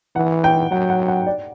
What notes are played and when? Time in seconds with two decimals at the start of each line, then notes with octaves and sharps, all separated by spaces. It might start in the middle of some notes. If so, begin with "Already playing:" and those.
0.16 E3 F#5
0.44 G5
0.71 F#3 F#5
0.90 F#5
1.08 F#5
1.27 D5